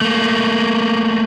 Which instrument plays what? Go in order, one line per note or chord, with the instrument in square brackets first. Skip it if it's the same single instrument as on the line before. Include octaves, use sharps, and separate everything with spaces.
[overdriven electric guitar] A3 A#3